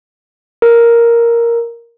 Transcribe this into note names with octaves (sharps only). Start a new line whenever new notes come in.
A#4